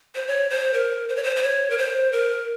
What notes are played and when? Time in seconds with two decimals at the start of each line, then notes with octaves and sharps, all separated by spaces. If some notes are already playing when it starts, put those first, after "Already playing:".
0.15 C5
0.27 C#5
0.50 C5
0.74 A#4
1.09 C5
1.16 C#5
1.23 C5
1.36 C5
1.43 C#5
1.70 A#4
1.78 C5
2.12 A#4